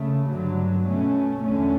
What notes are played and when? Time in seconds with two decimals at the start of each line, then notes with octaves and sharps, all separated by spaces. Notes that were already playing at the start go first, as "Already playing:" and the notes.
Already playing: C#3 A3
0.29 G2 D3 F#3
0.85 B2 A3 C#4
1.42 E2 D3 A3 C#4